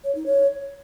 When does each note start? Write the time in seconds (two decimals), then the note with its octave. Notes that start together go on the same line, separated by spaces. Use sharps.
0.04 C#5
0.15 D#4
0.26 C#5